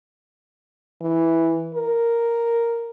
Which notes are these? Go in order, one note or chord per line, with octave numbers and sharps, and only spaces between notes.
E3
A#4